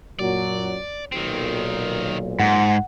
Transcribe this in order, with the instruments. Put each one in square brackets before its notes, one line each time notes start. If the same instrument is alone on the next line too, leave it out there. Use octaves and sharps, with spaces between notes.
[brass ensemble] F#2 A#2 F#3 [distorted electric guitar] D5
[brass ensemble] B1 A#2 [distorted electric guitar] D#3 C4
[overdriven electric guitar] G#2 [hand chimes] F#5